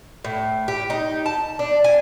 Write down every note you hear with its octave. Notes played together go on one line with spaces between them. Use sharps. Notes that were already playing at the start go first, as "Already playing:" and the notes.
A2
G4
D#4
A5
D4
G#5